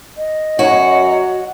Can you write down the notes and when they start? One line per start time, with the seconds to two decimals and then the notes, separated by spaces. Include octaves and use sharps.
0.17 D#5
0.59 F#2 F#4 C#5